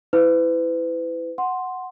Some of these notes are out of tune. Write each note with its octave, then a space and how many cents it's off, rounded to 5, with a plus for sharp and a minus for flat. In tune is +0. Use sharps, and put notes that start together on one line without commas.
E4 +0 B4 +35
F#5 +0 C6 +0